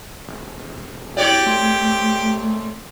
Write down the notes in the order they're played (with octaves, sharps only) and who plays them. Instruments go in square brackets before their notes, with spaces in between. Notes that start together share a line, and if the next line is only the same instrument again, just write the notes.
[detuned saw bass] E1
[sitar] C4 C#5 D5 [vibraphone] E4 F#4 [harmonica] G4
[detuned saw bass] A3 [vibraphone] C6